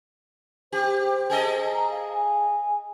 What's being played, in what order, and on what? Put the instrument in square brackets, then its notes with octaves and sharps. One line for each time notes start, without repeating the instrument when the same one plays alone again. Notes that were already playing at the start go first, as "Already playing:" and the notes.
[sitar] G4 [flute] C5
[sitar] G#4 A4 D#5
[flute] A#5
F5
G#5